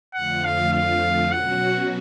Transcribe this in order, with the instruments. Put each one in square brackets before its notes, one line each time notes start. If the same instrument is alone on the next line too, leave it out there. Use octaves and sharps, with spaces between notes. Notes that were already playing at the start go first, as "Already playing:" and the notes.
[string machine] F2 D3 F3 A3 F4 [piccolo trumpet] F#5
[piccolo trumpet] F5
F5
[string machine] B2 F#3 C#4 F#4 [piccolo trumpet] F#5